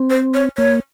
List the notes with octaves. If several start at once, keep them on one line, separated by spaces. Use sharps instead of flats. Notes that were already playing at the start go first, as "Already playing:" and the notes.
Already playing: C4
C5
C#5
A#3 C#5